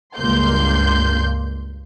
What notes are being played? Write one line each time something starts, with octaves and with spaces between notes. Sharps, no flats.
C#2 G2 A#3 C6 G6